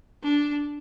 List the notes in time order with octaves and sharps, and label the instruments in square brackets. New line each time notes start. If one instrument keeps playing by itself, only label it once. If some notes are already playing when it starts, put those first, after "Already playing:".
[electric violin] D4